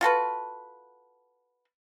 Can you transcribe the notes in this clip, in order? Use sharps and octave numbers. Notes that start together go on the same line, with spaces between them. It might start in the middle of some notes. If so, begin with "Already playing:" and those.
F4 F#4 A4 B4